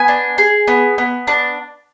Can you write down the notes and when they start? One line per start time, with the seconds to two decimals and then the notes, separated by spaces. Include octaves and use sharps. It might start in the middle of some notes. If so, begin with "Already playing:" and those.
Already playing: B3 G#5
0.08 D4
0.38 G#4
0.68 B3
0.98 B3
1.27 D4